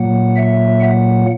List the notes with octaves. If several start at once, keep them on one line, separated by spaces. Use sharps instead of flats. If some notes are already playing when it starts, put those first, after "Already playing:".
Already playing: A#2 F#3 A#3 F#5
E5
F#5